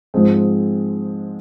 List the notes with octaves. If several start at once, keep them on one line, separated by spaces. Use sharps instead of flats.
G#2 F3 G#3 C4